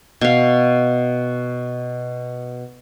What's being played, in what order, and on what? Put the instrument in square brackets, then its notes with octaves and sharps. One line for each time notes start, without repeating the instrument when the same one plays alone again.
[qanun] B2 F5